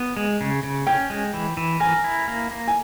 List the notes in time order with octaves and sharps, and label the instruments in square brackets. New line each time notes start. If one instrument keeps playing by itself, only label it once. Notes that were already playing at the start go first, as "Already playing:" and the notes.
Already playing: [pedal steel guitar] B3
G#3
C#3
C#3
[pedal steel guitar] C#4 [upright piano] G5
[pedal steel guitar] G#3
E3
E3
[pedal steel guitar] A#4 [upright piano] G#5
[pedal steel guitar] E4
A#3
A#3
[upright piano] G#5